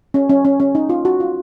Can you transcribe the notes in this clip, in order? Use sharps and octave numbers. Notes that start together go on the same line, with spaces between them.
C#4
C#4
C#4
C#4
D#4
F4
F#4
F4